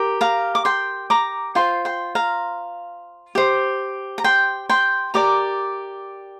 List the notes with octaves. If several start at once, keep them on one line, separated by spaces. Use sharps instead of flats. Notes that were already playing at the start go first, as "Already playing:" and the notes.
Already playing: G4 A#4
F5 A#5
D6
G5 C6
A#5 D6
F4 C5 G5 C6
G5 C6
F5 A#5
G4 C5
A#5
G5 C6
G5 C6
G4 A#4 D5 A#5 D6